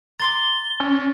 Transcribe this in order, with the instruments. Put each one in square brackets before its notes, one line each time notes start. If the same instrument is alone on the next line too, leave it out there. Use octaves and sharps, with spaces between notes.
[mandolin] A#5 C6 D6 [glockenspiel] A6 [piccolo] G7
[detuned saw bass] C#4